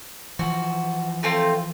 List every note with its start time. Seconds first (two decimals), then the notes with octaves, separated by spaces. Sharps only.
0.39 E3 F3 F#4
1.23 A3 C4 F4